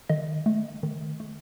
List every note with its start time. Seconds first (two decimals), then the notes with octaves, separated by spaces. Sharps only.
0.10 D#3 D#5
0.46 A3
0.83 D#3
1.20 A3